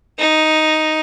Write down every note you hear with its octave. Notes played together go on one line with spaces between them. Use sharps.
D#4